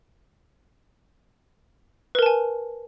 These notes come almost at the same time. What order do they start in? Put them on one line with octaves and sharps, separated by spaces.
B4 A#4 A5 G#5